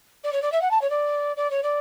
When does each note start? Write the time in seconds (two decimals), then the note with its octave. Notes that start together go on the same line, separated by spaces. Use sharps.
0.23 D5
0.32 C#5
0.41 D5
0.52 E5
0.61 F#5
0.70 A5
0.81 C#5
0.90 D5
1.36 D5
1.50 C#5
1.63 D5